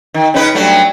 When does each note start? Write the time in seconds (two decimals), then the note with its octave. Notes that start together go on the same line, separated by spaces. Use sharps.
0.14 D#3
0.34 C#3 D#4 B4
0.55 G2 F#3 A3